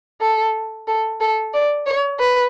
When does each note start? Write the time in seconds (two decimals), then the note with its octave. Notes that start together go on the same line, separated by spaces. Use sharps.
0.21 A4
0.87 A4
1.21 A4
1.53 D5
1.86 C#5
2.19 B4